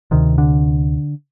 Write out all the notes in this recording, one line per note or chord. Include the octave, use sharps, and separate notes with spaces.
D2 C3 D#3
D3